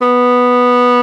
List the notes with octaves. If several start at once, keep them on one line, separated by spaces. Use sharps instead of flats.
B3